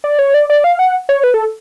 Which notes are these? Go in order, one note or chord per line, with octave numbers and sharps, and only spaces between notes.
D5
C#5
D5
D5
F5
F#5
C#5
B4
A4